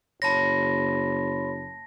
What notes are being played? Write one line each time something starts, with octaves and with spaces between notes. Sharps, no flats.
F#1 C#5 A5 B5 C6 A#6